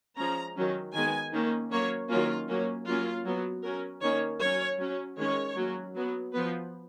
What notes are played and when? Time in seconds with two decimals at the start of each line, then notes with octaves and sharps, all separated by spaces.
0.17 F3 G#3 C#4 A#5
0.55 D#3 F#3 C#4
0.94 D#3 G#3 B3 G#5
1.32 D#3 A#3 C#4
1.71 F#3 A#3 C#4 C#5
2.09 D#3 F#3 A#3 C#4 F4
2.47 F#3 A#3 C#4
2.86 F#3 A#3 C#4 F4
3.25 F#3 B3
3.63 F#3 C#4 A#4
4.02 D#3 A#3 C#4 C#5
4.41 F#3 C#4 C#5
4.79 F#3 C#4
5.17 D#3 G#3 C#4 C#5
5.55 F#3 A#3 C#4
5.95 F#3 B3
6.33 F3 B3 B4